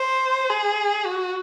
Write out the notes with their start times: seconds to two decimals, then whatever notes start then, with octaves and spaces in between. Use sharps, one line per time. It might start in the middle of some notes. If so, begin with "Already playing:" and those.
Already playing: C5
0.50 G#4
1.06 F#4